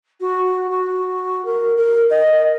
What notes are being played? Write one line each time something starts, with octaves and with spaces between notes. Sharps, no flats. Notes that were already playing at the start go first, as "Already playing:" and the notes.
F#4
F#4
A#4
A#4
D#5